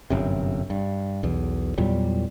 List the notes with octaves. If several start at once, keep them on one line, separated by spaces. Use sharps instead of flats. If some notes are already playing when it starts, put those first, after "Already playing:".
G1 F#2 C3
G2
B1 E2
E2 A#2 F#3 G3